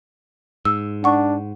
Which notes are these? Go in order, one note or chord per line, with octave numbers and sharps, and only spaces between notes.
G#2 E6
D4 F#5 C#6